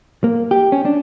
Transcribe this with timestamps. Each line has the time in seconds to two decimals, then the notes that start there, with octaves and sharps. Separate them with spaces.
0.24 A#3
0.51 G4
0.72 C#4
0.85 D4